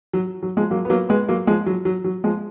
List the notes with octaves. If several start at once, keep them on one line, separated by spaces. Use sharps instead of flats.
F#3
F#3
F3 G#3
F#3 A#3
B3
F#3 A#3
G#3 B3
F#3 A#3
F3 G#3
F#3
F#3
F#3
F3 G#3